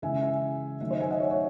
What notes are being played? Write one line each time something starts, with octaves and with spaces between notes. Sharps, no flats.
C#3 E3 G#3 E5 G#5
E5 G#5
D#3 F#3 A3 E5
C5 D#5
E5 G#5
D#5 F#5
C#5 E5
C#5